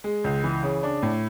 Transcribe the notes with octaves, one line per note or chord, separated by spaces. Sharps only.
G#3
C#2
E3
C#3
D4
A2